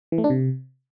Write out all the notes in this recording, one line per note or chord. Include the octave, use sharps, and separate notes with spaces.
E3
A3
D4
C3